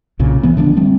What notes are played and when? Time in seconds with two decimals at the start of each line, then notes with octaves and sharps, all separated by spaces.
0.19 B1 A#2 C#3
0.43 E3 B3
0.57 D3 F3 G3 D4
0.77 G3 A3 C4